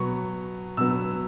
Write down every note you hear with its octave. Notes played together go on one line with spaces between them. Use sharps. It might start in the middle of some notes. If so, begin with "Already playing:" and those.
Already playing: B2 F#3 B3 C#6
B2 F#3 B3 E6